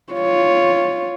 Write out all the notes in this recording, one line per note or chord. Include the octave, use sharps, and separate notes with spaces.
F4 C#5